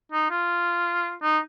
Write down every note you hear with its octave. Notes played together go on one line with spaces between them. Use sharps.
D#4
F4
D#4